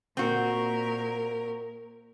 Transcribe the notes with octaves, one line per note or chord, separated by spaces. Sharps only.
A#2 C4 F#4 A#4